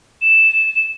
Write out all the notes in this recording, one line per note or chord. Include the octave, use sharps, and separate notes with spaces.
E7